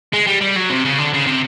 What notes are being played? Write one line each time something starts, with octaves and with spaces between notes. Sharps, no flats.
G#3
G3
G3
F#3
C3
C#3
D3
C#3
C3